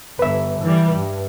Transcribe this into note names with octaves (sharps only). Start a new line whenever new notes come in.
G1 B4 E5
E3 G3
G2